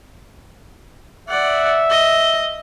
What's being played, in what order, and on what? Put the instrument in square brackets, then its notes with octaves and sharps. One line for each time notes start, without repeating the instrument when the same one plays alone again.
[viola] D5 F#5 [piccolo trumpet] E5
[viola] D#5